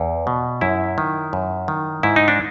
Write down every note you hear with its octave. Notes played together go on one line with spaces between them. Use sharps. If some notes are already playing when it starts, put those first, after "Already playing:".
Already playing: E2
B2
F#2 E4
D#3
F#2
D#3
G#2 E4
D#4
D4